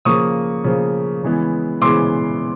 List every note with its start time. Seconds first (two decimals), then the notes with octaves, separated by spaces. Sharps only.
0.05 C#3 F3 A#3 C#6 D#6
0.64 C#3 F3 A#3
1.23 C#3 E3 G#3 B3
1.81 C#3 E3 G#3 B3 C6 D6